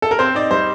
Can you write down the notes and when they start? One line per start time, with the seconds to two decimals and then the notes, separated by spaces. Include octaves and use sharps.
0.02 A4
0.11 A#4
0.19 C4 C5
0.35 D#4 D5
0.51 G3 C5